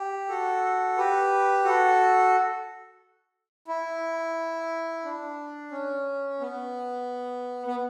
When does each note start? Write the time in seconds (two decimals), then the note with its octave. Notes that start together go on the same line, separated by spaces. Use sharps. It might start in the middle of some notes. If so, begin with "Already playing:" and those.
Already playing: G4
0.28 F#4 A4
0.97 G4 B4
1.64 F#4 A4
3.68 E4
5.04 D4
5.71 C#4
6.40 B3
7.67 B3